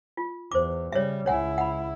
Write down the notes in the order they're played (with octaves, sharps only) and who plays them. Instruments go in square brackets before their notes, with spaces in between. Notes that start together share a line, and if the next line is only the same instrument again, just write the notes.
[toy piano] F4
[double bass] E2 [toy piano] C5 D6
[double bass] C#3 G3 [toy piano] C#5 E5
[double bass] C#2 E4 [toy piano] C#5 F#5 G#5
[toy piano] F#5 B5